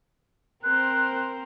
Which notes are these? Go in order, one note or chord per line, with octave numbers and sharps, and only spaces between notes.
C4 A#4 C5 F#6